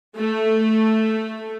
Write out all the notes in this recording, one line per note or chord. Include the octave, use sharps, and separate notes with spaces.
A3